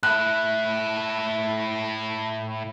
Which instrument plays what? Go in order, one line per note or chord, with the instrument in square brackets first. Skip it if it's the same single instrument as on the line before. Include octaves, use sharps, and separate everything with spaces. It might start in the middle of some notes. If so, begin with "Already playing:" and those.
[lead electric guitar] A2 E4 [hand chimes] F#6